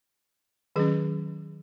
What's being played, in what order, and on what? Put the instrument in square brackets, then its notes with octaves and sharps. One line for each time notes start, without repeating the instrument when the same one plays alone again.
[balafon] D#3 F#3 C#4 G#4